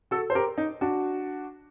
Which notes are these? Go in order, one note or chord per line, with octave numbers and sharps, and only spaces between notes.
F#4 A4
C5
G4 A#4
D#4
D4 F#4